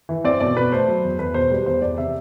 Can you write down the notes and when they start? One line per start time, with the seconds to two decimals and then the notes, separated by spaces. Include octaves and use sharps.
0.09 E3
0.24 C4 D5
0.40 B2 D5
0.57 B2 B4
0.72 A3 C5
0.88 F#3
1.03 E2
1.19 E2 B4
1.34 B2 C5
1.51 G3 B4
1.66 E2 C5
1.82 E2 D5
1.98 C3 E5